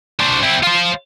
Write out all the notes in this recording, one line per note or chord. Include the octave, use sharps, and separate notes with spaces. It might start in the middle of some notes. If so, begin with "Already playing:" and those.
D4 C5
C4 E4
F4 C5